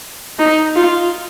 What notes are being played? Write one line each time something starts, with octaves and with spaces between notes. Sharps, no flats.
D#4
F4